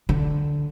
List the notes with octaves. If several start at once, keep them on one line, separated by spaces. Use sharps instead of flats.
D3